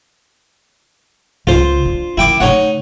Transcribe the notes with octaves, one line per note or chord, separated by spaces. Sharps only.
C#2 F4 C5
D4
D#3 C#4 E4 G5 D6
C#3 A3 D#4 C#5 F#5